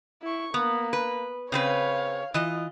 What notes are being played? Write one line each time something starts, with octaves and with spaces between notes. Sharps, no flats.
E4 C#6
A#3 B3
B4
C#3 C4 B4 C#5 F5
E3 F4 D#5